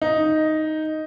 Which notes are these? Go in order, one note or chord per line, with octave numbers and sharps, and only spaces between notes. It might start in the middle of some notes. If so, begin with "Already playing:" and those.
D#4